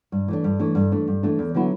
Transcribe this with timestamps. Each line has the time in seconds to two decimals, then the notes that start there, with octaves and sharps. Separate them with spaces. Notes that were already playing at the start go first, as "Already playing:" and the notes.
0.12 G2
0.28 E3 A3 D4
0.44 G2
0.59 E3 A3 D4
0.75 G2
0.92 E3 A3 D4
1.08 G2
1.23 E3 A3 D4
1.39 E2
1.54 D3 F#3 B3 E4